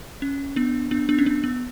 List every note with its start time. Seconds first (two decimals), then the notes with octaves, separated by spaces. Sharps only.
0.22 C#4
0.56 B3 D4
0.91 B3 D4
1.09 B3 D4
1.19 C#4
1.26 B3 D4
1.44 B3